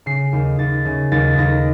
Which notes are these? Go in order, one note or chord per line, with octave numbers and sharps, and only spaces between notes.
C#3 C7
D#2
D#2 A6
C#3
D#2 A6
D#2 A#6